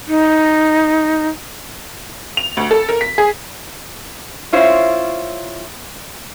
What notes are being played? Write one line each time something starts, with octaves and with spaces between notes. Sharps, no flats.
D#4
F7
D2
A4
A#4
B6
G#4
C#4 E4 F4 C5 C#5